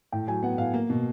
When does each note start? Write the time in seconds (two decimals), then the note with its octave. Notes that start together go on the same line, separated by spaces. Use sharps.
0.12 A2 G5
0.27 F#3 G#5
0.42 B3 F#5
0.58 A2 F5
0.74 A#3
0.90 B2